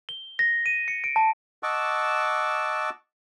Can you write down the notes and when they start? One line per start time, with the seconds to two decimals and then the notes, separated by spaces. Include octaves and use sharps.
0.09 G7
0.39 A#6
0.66 D#7
0.88 C#7
1.04 D7
1.16 A5
1.63 D#5 F#5 A5 C#6 D6 E6